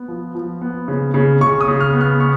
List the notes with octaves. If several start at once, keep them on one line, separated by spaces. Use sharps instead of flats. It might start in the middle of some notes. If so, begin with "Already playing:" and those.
Already playing: B3
F3
F3
B3
C#3
C#3
C#3 C#6
D#6
C#3
F6
B3
F6
B3 C#6